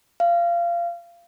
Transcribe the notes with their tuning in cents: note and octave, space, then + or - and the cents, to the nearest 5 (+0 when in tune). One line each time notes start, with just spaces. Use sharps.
F5 -25